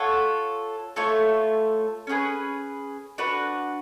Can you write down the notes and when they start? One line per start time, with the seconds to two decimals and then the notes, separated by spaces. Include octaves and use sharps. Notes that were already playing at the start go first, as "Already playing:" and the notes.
Already playing: F4 A4 C#5 F#5
0.96 A3 F4 A4 C#5
2.07 C#4 F4 G#4 B4
3.18 D4 F#4 B4